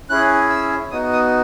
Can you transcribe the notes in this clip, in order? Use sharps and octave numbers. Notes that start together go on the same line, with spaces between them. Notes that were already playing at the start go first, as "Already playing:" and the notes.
C#4 E4 G#4 F#6
E6
B3 D#4 F#4 D#6
D#6